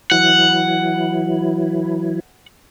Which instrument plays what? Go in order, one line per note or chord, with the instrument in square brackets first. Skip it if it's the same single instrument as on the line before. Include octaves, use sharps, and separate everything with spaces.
[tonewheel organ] E3 F#3 E4 [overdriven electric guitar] F#5